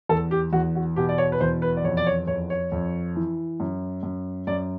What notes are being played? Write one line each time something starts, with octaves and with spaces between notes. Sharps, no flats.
E2 A4
G4
E2 F#4
F#4
B2 G4
D5
C#5
B4
E2 C5
B4
D5
F2 C#5
D5
C#5
F2 C#5
C#5
F2
E3
F#2
F#2
F#2 D5